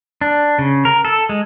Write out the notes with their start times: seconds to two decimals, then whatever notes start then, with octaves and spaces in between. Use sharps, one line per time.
0.21 D4
0.59 C#3
0.85 A#4
1.05 A4
1.29 G#3